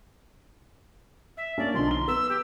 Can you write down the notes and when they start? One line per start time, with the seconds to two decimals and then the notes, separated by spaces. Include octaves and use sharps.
1.37 E5
1.58 A#3 C#4 D4 D5
1.74 B1 D3 F3 C6
1.87 A#5 G7
2.08 B3 E6
2.29 G4